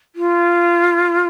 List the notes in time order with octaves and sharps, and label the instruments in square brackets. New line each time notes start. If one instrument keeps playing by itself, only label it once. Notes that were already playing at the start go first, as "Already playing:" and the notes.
[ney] F4